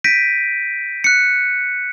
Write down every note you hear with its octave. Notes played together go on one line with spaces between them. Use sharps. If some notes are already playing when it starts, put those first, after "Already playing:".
G6 A#6 B6 D7 D#7
F#6 C#7